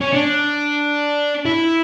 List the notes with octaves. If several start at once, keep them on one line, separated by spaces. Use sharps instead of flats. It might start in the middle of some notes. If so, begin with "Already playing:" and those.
C#4
D4
E4